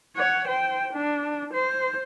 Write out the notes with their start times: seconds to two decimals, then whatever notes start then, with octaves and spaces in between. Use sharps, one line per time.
0.17 C#5 F#5
0.47 C5 G5
0.93 D4
1.53 C5